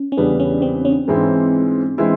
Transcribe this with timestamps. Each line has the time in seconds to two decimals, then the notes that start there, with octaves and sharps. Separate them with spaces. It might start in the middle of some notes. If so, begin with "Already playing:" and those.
Already playing: C#4
0.12 C#4
0.17 E2 C#3 E3 G3 B3 D4
0.40 C#4
0.62 C4
0.85 C#4
1.08 G#2 E3 G#3 C4 E4
1.98 E3 G#3 C4 E4